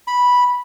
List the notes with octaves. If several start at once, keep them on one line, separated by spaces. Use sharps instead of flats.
B5